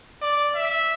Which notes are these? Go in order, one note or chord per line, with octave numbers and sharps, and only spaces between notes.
D5
E5